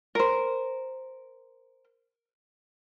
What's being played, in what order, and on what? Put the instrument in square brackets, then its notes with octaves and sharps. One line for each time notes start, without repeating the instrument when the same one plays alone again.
[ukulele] A#4 C5